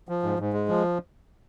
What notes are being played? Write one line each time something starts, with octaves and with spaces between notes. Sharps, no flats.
F3
G#2
G#2
G#3
F3